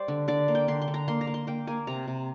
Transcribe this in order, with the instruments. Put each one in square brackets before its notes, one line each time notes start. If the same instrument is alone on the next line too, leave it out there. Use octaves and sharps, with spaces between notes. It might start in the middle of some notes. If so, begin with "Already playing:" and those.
Already playing: [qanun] G3 C5 D5
D3
D3 D5
A#3
G5
D3 C6
C6
D3
A#5
A#3 C6
A#5
A#3
C6
A#3 G5
A#3 G#5
C3 A#5
C3